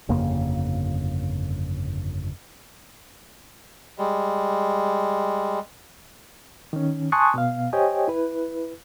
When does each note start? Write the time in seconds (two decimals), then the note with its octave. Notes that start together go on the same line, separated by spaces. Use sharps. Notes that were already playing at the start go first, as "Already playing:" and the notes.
0.09 G1 F2 C#3 A#3
3.98 G3 G#3
6.73 D#3 C#4
7.12 G#5 A5 C6 C#6 D#6 F#6
7.34 B2 B3 F5
7.73 G4 C5 C#5 D#5 G5 G#5
8.08 E4 B4